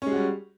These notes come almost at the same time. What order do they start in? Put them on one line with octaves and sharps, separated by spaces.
C#4 G#3 F#4 G3